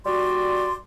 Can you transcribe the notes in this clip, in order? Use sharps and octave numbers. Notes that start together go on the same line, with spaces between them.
G3 F#4 D5 C6